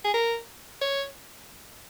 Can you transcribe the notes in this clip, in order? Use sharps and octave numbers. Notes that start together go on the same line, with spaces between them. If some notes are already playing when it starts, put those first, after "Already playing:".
G#4
A#4
C#5